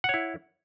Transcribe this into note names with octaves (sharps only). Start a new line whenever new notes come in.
E4 C#5 F#5